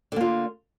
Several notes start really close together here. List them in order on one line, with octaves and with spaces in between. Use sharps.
D3 A#3 F4